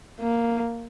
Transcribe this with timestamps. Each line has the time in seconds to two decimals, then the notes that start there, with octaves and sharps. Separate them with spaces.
0.20 A#3